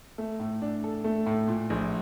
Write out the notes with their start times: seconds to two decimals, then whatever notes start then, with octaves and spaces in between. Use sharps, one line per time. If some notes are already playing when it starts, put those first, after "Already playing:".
0.18 A3
0.40 A2
0.62 D4
0.84 A4
1.04 A3
1.26 A2
1.48 A#2
1.70 A#1